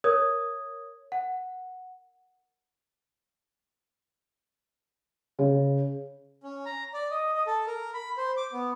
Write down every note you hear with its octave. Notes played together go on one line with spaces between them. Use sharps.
A#4 C#5 D#6 G#6
F#5
C#3
C#4
A#5
D5
D#5
D#5
A4
A#4
B5
C5
D6
B3